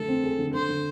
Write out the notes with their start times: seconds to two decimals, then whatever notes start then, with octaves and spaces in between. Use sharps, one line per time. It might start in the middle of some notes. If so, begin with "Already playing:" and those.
Already playing: D3 A3 A4
0.08 C4
0.24 G#4
0.38 D3
0.53 D3 C5
0.69 D3